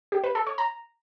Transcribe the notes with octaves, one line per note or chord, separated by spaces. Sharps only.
G4
B4
A4
C#5
A#5